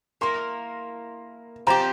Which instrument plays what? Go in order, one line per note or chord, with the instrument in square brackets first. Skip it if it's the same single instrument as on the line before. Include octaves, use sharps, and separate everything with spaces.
[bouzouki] A#3 E4 A#4 [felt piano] C6
[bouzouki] F3 C4 G4 [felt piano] A#5